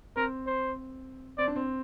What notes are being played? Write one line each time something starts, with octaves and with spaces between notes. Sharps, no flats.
C4 A#4
C5
C4 D5
D4
C4